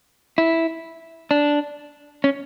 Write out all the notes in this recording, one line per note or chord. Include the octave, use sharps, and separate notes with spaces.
E4
D4
C#4